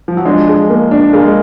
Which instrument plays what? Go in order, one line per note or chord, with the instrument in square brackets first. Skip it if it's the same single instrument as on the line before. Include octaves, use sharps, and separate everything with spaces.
[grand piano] F3
F#3
[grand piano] F3 G#3 [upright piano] D4
[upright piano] G#4
A#3
D4
[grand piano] A#3 [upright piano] G#4
[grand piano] G#3